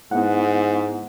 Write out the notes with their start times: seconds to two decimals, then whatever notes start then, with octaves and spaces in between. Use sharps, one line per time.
0.11 G#2 B3 E4 F#5